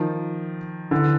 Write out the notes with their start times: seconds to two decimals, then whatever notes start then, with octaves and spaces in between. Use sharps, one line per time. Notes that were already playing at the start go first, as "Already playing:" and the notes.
Already playing: D#3 F3
0.91 D3 E3